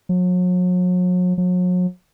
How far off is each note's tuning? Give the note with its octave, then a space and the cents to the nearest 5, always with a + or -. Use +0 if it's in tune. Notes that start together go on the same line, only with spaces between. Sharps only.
F#3 -40
F#3 -40